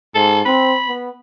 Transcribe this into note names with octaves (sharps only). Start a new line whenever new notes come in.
G#2 A4
C4 B5
B3